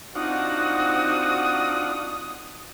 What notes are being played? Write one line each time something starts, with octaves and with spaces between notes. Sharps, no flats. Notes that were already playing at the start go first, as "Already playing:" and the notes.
C4 D4 D#4 F4 F#4 F#5 D#6